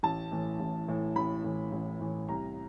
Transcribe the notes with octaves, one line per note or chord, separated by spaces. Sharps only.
A1 A5
A2 E3
A1
A2 E3
A1 B5
A2 E3
A1
A2 E3
C2 A#5